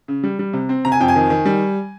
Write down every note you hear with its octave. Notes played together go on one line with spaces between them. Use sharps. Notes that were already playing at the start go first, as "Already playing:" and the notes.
C#3
G3
G3
C3
C4
C3 A#5
G#5
F2 G5
G#5
D#3
D#3
G3